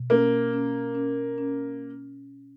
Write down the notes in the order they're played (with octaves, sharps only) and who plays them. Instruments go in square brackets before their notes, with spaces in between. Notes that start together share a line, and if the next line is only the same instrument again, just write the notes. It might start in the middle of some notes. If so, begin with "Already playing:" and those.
Already playing: [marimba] B2
[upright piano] A#3 [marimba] C#4
[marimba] C#4
C#4
C#4